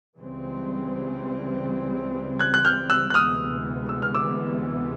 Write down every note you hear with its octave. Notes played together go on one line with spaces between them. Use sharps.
C#2 C#3 E3 G3 C4
F#6 G#6
F#6
F6 G6
E6 F#6
F#6
D2 C3 E3 G#3 B3 D#6 F6
E6
F6
D6 E6